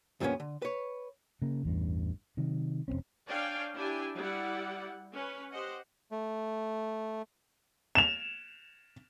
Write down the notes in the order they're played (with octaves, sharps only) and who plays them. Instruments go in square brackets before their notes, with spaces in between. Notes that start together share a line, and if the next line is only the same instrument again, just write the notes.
[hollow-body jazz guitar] D2 G2 F3 A#3 B3 C#4
D3
B4 C#5
[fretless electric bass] C#3 A#3
A1 E2 G2
C3 D#3 F#3
F1 G#2 C4 C#4
[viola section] D4 C#5 D5 F5 G5 G#5
D4 E4 G4 G5 G#5
G3 E4 D5 F#5
C#4 B4
G4 C5 D#5 F#5
[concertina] A3
[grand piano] E7 F7